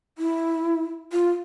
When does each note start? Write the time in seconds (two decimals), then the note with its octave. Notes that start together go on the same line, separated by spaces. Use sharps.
0.18 E4
1.13 F4